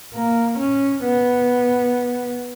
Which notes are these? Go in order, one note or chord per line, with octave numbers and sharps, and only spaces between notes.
A#3
C#4
B3